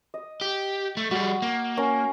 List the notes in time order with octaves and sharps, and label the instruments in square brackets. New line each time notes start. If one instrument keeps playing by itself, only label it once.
[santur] D#5
[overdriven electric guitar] G4
A3
[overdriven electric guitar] G3 G#4 [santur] F#4
[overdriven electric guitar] A#3
[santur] C#4 A#4 A#5